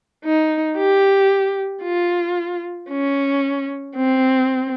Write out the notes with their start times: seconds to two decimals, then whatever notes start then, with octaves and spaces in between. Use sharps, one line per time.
0.25 D#4
0.77 G4
1.83 F4
2.90 C#4
3.96 C4